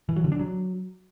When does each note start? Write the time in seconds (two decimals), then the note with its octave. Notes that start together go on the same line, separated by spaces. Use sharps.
0.09 E3
0.16 F#3
0.24 D3
0.32 D4
0.39 F#3